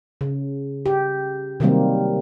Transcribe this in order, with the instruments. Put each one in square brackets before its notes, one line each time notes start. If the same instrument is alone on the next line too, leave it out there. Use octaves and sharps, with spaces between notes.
[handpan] C#3
G4
C3 D#3 F#3 G3 A#3 C4